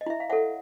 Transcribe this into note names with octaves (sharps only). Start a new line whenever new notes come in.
D#5
E4 E5
F5
A4 C#5 E5 F#5